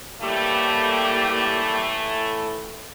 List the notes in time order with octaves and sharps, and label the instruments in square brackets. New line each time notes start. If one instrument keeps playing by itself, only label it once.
[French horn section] A2 E3 A3 [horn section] G3 A#3 G4